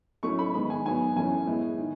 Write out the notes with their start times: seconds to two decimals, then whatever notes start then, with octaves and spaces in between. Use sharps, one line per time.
0.23 A2 F#3 A3 C#4 C#6
0.39 B5
0.54 G#2 D#3 G#3 B3 B5
0.70 G#5
0.86 G#2 F#3 B3 G#5
1.16 F#2 E3 A3 C#4 G#5
1.47 A2 G#3 B3
1.79 D#3